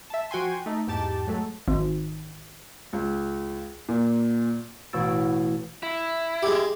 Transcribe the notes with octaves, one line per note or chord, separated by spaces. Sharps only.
E5 A5
F3 F#4 G5 G#5 C6
A3 D#4
E2 G#2 G4 A5
F#3 G#3 A3 A4
G#1
C#2
A#2
A1 B2 F#4 E6 A6 D7
E4
G#3 G4